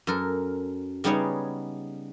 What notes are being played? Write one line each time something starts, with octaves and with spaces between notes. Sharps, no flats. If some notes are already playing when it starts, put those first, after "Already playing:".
F#2 A4 A#4
C#3 G3 B3 D#4 G#4 C#5